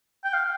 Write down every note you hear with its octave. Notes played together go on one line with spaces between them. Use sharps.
G5
F5